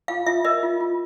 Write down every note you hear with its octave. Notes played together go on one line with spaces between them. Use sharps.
F4 F5
F4 E5
A#4 D#5
F4
F4